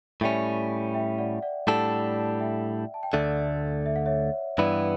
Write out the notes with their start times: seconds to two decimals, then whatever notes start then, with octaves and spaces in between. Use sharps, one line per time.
0.21 A2 G3 C#4 E5 G5
0.94 E5 G5
1.18 D5 F#5
1.42 D5 F#5
1.67 A2 G3 D4 A4 D5 F#5
2.40 E5 G5
2.94 A5
3.03 G5
3.13 D2 D3 A3 D5 F#5
3.86 E5
3.96 F#5
4.06 C#5 E5
4.58 G2 E3 B3 E4 B4 D5